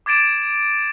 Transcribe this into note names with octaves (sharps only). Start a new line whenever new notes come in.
D6 G#6 A6 D7 E7